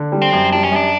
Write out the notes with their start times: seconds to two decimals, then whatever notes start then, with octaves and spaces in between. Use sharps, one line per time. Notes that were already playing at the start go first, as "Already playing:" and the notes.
Already playing: D3
0.12 G3
0.22 C4
0.32 F#2
0.52 G3 D4
0.64 C#4
0.72 F#2 D4